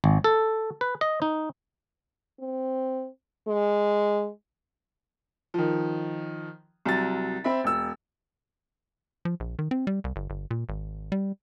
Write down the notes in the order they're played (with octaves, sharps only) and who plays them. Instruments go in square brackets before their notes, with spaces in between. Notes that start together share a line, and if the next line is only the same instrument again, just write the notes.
[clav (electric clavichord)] G#1
A4
B4
D#5
D#4
[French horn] C4
G#3
[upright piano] D#3 F3
C2 F#3 A6
C4 E5 B5
E1 E6
[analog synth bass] F3
A#1
D#3
C4
G3
C2
G1
G1
A#2
G#1
G3